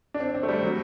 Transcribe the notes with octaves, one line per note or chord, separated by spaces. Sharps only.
D4
C4
C4
A3
G3
F#3